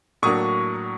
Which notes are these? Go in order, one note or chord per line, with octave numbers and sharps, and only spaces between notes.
A2 F#3 A#3 D4 C#6 D#6